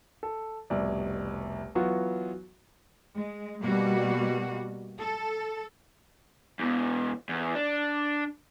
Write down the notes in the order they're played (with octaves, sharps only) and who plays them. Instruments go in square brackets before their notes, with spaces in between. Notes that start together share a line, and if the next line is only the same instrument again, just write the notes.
[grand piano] A4
F1 C2 B2 D5
E3 F#3 B3 F4 F#4
[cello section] G#3
B2 G3 A#3 F#4
A4
[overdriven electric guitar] E2 B2
E2
D4